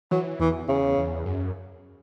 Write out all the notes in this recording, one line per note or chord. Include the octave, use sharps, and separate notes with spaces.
E3 F#3
E2 E3
E2 C#3
E2
F#2